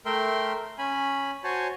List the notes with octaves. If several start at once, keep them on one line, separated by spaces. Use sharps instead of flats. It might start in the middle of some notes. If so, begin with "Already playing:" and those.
A3 A#4 E5 G5 C6
C#4 G#5 B5
F#4 C5 C#5 G#5 A5